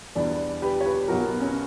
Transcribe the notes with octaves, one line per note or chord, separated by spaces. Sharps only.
E2 B2 G3 B3 D4
G4 B4
C#5
G4 B4
B1 B2 F#3 F#4 A#4
B3
C#4